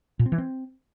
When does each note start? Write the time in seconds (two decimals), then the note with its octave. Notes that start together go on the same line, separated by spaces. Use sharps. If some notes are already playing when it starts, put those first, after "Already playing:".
0.19 A#2
0.26 C4
0.32 E3
0.38 C4